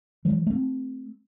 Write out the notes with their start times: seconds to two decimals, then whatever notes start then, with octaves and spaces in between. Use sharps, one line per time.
0.25 E3 F#3 G#3
0.47 A3 C4